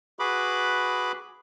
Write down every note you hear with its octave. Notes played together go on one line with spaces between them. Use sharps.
F#4 G#4 B4 B5 D6